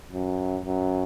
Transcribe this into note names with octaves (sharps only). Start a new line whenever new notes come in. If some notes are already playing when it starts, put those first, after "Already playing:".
F#2
F#2